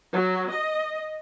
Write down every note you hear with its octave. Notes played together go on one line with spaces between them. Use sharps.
F#3
D#5